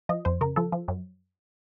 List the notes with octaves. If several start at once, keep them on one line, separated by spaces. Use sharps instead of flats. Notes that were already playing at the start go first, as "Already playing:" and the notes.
F3 D#5
F2 C5
C#3 A#4
F3 A4
F3
F#2